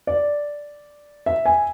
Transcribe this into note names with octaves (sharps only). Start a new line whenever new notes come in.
D5
E5
G#5